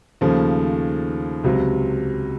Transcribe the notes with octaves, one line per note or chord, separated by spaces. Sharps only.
D#2 C#3 F3 A3
C#2 C3 F#3